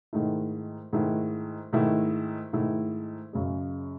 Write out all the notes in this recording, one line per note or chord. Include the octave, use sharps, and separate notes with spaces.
G#2 D#3 A3 E4
G#2 D#3 A3 E4
G#2 D#3 A3 E4
G#2 D#3 A3 E4
F#2 C#3 G#3